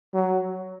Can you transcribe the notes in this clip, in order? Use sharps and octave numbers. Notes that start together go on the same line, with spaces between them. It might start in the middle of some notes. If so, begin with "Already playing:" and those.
F#3